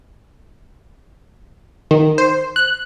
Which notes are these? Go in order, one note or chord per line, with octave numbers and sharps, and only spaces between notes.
D#3
C5
F#6